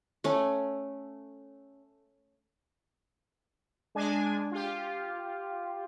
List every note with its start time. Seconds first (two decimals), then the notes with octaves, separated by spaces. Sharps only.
0.24 A3 C#4
3.95 G#3 D4 G#5
4.52 F4 G4